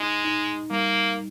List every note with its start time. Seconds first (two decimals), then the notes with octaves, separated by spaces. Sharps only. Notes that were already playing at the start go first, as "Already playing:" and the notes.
Already playing: G#3 D#4
0.25 D#4
0.71 G3 A#3